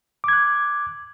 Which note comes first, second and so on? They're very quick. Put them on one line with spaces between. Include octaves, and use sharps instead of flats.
D6 G#6 F#6